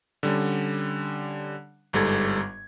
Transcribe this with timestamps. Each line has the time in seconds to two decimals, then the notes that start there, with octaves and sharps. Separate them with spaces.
0.23 D3 G3 C#4
1.93 G1 G#2 G3 A4 G#6